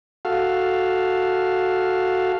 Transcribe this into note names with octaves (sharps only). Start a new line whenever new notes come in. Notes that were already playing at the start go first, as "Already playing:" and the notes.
F#4 A4 F5